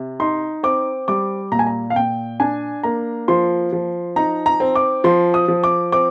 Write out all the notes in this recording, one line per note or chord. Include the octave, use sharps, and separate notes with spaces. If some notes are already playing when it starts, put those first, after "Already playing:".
Already playing: C3
D#4 C6
C4 D6
G3 D6
A#2 A#5
G#5
A#5
F5
A#2 G5
D4 G#5
A#3 A#5
F3 C6
F3
D#4 A#5
A#5
C4
D6
F3 C6
D#6
F3
D6
C4 D6